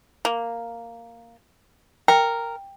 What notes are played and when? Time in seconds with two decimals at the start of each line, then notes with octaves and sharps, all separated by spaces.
0.25 A#3
2.08 A#4 G5